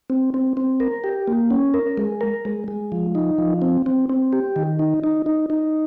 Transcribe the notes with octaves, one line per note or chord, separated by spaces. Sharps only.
C4
C4
C4
A#4
G4
A#3
C#4
A#4
G#3
A#4
G#3
G#3
F3
D#4
F3
C4
C4
C4
G4
D#3
D#4
D#4
D#4
D#4